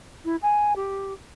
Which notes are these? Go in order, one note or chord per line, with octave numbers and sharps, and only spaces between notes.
E4
G#5
G4